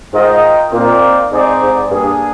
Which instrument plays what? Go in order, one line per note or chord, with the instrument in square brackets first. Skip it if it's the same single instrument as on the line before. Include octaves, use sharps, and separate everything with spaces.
[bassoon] G#2 [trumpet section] F4 A#4 D#5 G5
[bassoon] A#2 [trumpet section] C4 D#4 A#4 D5 F5
[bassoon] G#2 [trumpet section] C4 D#4 G#4 D5
[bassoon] G#2
[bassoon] G2 [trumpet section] A#3 D4 G#4